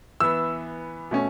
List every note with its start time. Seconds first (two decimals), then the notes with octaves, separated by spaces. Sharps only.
0.20 E3 B3 E6
1.11 B2 A3 C#4